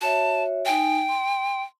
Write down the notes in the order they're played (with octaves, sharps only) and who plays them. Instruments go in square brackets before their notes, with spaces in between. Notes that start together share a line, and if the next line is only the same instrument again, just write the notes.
[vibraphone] F#4 C#5 E5 [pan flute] A5
[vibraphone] D#4 G#5 [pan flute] G5
[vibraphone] C6